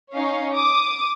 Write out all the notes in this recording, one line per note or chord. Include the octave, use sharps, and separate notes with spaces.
C#4 D#4 C#5 F5
D6 D#6